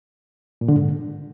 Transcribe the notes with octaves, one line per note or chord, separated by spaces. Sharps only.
A#2
D3
G#2